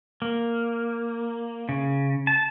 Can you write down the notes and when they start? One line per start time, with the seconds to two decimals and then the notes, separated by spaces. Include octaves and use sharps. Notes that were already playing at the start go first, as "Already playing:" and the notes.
0.22 A#3
1.69 C#3
2.27 A5